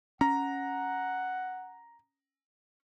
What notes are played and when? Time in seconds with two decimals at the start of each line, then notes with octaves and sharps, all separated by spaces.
0.21 C#4 F#5 A#5